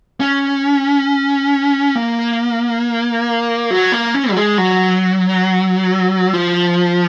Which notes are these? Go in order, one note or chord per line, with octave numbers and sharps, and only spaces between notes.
C#4
A#3
F#3
A#3
C#4
F#3
G#3
F#3
F3